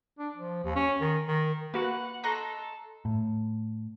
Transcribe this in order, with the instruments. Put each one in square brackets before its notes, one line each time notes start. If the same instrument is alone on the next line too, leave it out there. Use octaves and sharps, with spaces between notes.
[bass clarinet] D4
F3
D#2
C#4
D#3
D#3
[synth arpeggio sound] A#3 F#4 [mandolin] B4 [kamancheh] F#5
[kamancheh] A4 [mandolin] D#5 A#5 C6 [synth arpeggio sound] C#6 F#6 A#6
[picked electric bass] A2